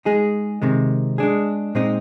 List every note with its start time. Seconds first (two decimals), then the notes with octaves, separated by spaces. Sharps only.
0.05 G#3 D#4 G#4
0.62 C3 D#3 G#3
1.18 G#3 D4 G#4
1.75 A#2 G#3 C4 D#4